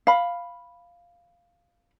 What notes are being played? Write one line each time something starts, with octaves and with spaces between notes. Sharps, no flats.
F5 B5